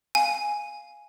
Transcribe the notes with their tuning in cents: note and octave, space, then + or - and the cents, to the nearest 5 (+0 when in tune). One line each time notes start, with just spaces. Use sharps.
F5 +0 G#5 +0